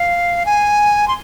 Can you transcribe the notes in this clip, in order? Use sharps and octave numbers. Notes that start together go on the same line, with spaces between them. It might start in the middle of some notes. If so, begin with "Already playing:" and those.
Already playing: F5
G#5
C6